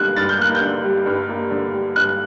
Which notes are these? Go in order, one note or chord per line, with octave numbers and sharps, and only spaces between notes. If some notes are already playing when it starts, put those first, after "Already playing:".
Already playing: D3 G3 A#3 F#6
G2 A6
G6
A#3 F#6
G6
D3
G3
G2
A#3
D3
G3
G2 F#6